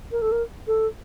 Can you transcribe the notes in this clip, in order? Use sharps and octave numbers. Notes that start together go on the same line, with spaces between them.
A#4
A4
A#4
A4